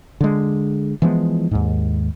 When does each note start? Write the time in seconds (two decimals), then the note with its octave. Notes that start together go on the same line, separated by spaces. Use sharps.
0.21 D3 G#3
1.02 E3 F3 G#3 B3
1.51 D#2 G#2